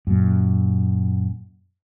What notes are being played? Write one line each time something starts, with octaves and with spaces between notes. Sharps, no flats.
F#2 A#2